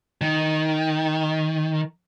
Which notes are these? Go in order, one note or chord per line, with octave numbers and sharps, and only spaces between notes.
D#3